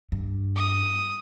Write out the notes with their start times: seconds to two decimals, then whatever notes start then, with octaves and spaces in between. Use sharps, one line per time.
0.12 G2
0.56 D#6